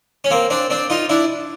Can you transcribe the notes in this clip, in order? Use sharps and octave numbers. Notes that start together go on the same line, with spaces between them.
C#4
A#3 C4
C4 D4
C4 D4
D#4 F4
D4 E4